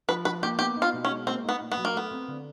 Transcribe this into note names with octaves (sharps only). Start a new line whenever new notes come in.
F3 B4
F3 B4
A#3 G4
B3 G4
D#4
F4
B2
C#4
G#3
A#3 C4
B3 D#4
A#2
B3
F#3
A#3
A3 B3
C4
D3